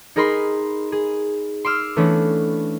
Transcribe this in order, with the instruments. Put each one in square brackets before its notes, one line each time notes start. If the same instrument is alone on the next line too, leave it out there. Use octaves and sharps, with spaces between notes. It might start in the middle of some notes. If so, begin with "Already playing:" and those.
[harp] D#4 G#4 A#4 D#5 B5 C6
G#4
C6 D6 E6 F6
E3 A3 B3 C#4 D4